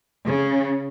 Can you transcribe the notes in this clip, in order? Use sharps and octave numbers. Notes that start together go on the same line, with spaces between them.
C#3